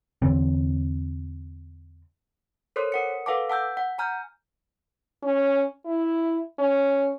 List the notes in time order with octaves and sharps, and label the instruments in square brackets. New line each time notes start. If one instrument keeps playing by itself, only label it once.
[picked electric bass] E2 D3 E3 C4
[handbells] A4 A#4 C5 C#5 C6 F#6
A#4 F#5 C#7
A4 B4 F5 F#5 A5 D6
F#5 A5 E6 G6
F#5
G#5 A#5 F6 G6
[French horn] C#4
E4
C#4